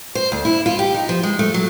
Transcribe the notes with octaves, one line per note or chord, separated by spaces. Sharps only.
C5
D2
E4
F4
G4
D#4
F3
G#3
A3
F#3